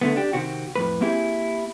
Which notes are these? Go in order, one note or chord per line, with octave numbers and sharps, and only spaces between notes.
D3 A3 B3
D4 G4
C3 D#3 C4 F#4
F2 A2 B4
A#3 C4 E4 G4 G#4